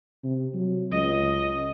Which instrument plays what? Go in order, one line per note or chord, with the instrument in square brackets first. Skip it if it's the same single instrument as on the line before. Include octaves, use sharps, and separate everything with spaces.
[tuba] C3
F#3
[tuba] C#2 [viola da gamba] D#5